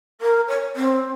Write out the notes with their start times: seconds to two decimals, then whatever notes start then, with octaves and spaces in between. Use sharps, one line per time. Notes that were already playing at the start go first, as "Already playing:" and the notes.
0.21 A#4
0.47 C#5
0.75 C4